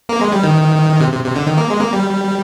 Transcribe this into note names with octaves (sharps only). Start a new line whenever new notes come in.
A#3
G#3
G3
D#3
C3
C3
C3
D3
D#3
A#3
G#3
A#3
G3